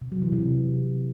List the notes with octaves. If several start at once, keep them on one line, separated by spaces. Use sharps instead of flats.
C3
F#3
E3
C3